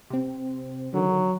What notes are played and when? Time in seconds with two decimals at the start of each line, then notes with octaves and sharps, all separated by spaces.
0.10 C3 C4
0.94 D3 D#3 F#3